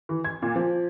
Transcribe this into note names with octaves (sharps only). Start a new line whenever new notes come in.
E3
G#6
A#2
F3